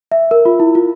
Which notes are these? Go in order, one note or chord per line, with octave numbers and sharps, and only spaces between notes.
E5
A#4
F4
E4
F4